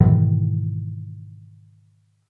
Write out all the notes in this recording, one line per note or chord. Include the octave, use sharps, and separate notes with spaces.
G#2 B2 D#3 E3